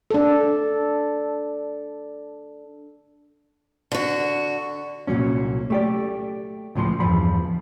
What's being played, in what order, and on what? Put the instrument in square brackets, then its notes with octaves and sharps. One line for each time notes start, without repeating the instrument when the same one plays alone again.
[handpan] D4 A4
[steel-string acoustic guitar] D3 F#4
[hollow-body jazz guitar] C2 A#2 E3 F#3 C#4
A3 G4 D5
C#2 A2 F3 C6
E2 G2 F3 B5